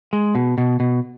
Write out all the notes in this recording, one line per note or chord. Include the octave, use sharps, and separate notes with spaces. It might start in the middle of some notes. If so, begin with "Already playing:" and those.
G#3
B2
B2
B2